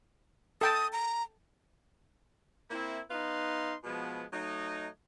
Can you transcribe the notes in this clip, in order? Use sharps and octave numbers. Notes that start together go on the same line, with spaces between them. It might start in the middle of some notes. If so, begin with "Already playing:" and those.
A4 G5 A5 D#6
A#5
A#3 C4 E4
B3 D#4 B4 F5 C6
B2 F3 G#3 B3
F#3 A3 D#4